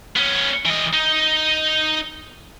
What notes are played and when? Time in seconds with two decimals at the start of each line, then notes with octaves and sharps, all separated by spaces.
0.17 B3 C#4
0.66 E3 D#5
0.94 D#4